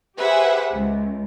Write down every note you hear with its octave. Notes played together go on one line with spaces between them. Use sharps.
G4 G#4 B4 C5 E5 F#5
C#2